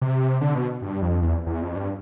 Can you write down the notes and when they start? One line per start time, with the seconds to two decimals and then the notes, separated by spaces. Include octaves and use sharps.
0.01 C3
0.41 D3
0.55 B2
0.82 G2
1.02 F2
1.22 E2
1.46 E2
1.63 F2
1.76 G2